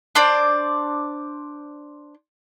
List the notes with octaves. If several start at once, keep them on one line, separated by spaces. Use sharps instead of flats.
D4 C5 D5